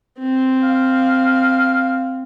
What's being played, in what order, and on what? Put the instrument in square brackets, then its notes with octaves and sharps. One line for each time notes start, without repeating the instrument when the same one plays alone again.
[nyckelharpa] C4
[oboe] F5